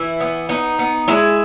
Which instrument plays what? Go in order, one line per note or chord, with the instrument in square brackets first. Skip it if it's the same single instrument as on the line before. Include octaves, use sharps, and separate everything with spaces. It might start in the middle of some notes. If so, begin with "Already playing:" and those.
Already playing: [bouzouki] E3 E4
B3
B3 D#4
B3
G#3 E4